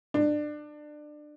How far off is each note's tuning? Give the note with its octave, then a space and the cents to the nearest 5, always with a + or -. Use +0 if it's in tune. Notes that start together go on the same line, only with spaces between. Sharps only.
D4 +25